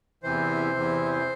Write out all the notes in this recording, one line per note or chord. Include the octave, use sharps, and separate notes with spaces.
E2 C3 E3 C5
E2 C3 E3